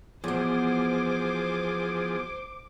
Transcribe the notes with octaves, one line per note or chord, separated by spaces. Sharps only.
E2 B2 F3 G#4 C5 D6